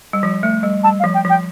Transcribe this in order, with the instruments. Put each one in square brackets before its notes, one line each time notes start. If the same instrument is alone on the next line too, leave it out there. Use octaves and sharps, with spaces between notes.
[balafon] G3
F3
A3
G3
[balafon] G3 [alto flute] A5
[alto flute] F5
[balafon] F3
[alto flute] G5
[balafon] F3
[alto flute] G5